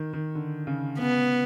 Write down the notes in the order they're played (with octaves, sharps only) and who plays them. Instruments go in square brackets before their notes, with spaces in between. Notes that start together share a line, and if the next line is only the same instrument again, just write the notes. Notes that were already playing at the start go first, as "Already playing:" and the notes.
Already playing: [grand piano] D#3
D#3
D3
C#3
[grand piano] C#3 [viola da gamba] B3